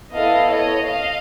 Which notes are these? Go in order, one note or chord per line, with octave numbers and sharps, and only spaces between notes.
B3 E4 A4 D#5 F5
C#5 D#5
D#5 F5